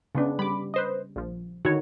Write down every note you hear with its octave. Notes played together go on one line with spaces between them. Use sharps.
C#3 B3 D4
G3 B5 D6
B4 C5 D#5
A#1 F3
D3 D#3 F#4 C#5